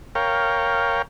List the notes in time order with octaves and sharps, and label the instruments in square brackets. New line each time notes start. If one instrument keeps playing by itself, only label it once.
[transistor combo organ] A#4 C#5 F5 G5